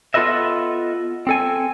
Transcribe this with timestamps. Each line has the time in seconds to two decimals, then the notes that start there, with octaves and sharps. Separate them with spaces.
0.14 B3 F4 A4 B4 D#5 E5
1.27 C4 A4 G#5